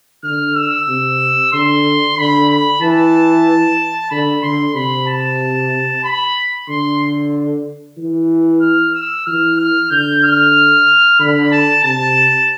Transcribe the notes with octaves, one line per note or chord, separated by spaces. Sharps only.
D3 F6
E6
C3
D3 C6
D3 B5
B5
E3 A5
D3 B5
D3 C6
C3 B5
A5
B5
D3 C6
E3
F6
E6
E3 F6
F6
D3 G6
F6
D3 B5
A5
C3 A5